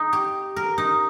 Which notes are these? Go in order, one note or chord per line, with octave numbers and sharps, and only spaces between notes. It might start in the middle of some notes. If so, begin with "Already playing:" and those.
Already playing: D#4
G4
A#4
D#4